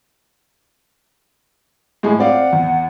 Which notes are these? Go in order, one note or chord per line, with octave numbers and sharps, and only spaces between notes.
A2 G#3 G#4
C4 D5 F5 F#5
E2